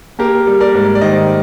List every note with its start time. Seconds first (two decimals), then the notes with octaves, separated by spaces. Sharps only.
0.19 A#3 G4 A#4
0.47 G3
0.60 A#4 D5
0.75 G#2
0.95 D5
1.01 D#3 C5 D#5